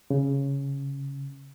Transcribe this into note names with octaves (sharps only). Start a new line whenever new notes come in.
C#3